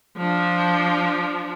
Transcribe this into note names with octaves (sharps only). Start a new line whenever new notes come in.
F3 D4